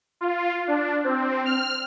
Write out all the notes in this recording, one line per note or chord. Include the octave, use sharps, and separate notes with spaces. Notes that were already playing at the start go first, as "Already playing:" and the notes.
F4
D4
C4
F6